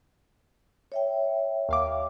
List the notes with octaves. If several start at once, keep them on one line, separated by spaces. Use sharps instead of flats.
C#5 E5 G5
D#2 F5 D6